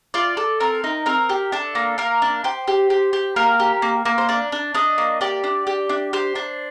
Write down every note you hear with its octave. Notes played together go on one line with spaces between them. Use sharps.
F4 D5
A4
C4 A#4
D#4
C4 A#4
G4
D4 A4
A#3
A#3 A#4
D4
G4 C5
G4
G4
G4
A#3 A#4
G4
A#3
A#3
C5
D4 D5
D4
D4 D#5
A#3
G4 D5
D4
G4
D4
G4 C5
D4